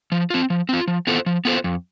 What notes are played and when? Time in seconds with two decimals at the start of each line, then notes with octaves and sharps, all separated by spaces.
0.12 F3
0.30 C4 F4
0.50 F3
0.69 C4 F4
0.87 F3
1.07 B3 F4 A4 C5
1.26 F3
1.45 B3 F4 A4 C5
1.64 F2